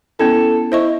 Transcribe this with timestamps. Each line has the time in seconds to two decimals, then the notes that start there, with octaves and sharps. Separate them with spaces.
0.19 B3 C#4 E4 A4
0.72 E4 C5 D#5 C#6